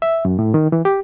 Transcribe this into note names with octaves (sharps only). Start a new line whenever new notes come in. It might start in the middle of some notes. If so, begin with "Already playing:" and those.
E5
F#2
A2
D#3
E3
G4